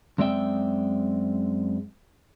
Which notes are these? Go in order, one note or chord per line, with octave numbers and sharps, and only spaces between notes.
F#2 G#3 C4 D5 E5 G5